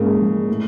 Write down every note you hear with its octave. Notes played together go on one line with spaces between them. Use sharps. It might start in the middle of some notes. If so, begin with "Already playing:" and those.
Already playing: G#2 C#3 A#3
F3
A2